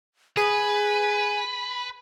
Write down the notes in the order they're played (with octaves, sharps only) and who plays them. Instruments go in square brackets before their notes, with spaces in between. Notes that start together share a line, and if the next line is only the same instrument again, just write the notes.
[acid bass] G#4 [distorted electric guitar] B4 [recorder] G#5